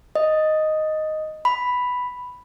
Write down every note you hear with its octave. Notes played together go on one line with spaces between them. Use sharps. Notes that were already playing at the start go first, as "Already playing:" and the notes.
D#5
B5